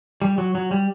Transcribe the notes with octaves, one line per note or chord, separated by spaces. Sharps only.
G3
F#3
F#3
G3